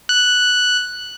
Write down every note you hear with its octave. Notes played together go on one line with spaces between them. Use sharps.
F#6